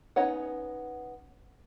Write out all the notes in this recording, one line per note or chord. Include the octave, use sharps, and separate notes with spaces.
B3 C#4 D#4 C#5 F#5